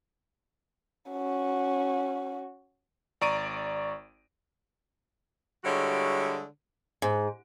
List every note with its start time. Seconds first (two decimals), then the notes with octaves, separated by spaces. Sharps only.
1.12 C#4 F#4
3.21 G#1 D5 A#5 C#6 D7 D#7
5.64 D3 G3 G#3 E4 F#4 C#5
7.02 G#2